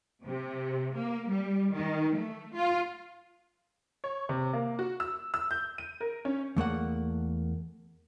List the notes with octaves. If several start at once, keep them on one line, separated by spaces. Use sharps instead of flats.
C3
A#3
G3
D#3
A3
F4
C#5
C3
A#3
F#4
E6
E6
G6
D#7
A#4
C#4
E2 A3 A#3 F#5